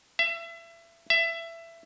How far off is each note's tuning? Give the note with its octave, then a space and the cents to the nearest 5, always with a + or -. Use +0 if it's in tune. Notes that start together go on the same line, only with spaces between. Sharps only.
E5 +30
E5 +20